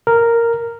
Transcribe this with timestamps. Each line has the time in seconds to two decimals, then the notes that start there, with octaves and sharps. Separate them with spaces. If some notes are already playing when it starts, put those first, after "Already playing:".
0.07 A#4